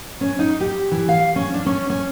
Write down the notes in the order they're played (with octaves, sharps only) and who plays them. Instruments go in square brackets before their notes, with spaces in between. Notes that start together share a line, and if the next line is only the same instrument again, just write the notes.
[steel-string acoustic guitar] C#4
D#4
G4
E3
F5
C#4
D4
C#4
C#4